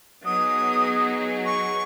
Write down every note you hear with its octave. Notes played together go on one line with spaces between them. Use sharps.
F#3 B3 D#4 G#4 D#6
C#6